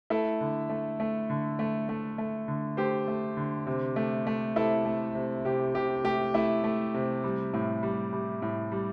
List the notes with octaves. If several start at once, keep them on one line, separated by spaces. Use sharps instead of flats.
A3 E4 A4
D3
A3
A3
D3
A3
A3
A3
D3
A3 G4 C5
A3
D3
C3
A3
A3
C3 E4 A4
A3
C3
C3 G4
C3 G4
A3 G4
A3 E4
A3
C3
G3
A2
G3
G3
A2
G3